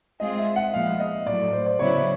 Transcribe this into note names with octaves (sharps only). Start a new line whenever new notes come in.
G#3 C4 F4 G#4 D#5
E5
F#5
A#2 F3 G#3 B3 F5
D#5
A2 F#3 A3 D5
C5
D5
C#3 F#3 B3 E4 C#5